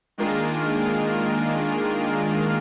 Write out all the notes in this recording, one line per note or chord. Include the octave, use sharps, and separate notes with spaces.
D#3 G#3 A#3 D4 F4 A#4